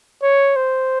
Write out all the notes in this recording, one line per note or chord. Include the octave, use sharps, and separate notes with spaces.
C#5
C5